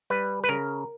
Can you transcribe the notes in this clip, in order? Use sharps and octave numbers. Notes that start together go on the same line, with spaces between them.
G3 B4
B4
C#3 A#4